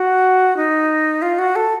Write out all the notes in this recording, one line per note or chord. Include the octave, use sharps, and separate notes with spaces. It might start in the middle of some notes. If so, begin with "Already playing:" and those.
Already playing: F#4
D#4
F4
F#4
A4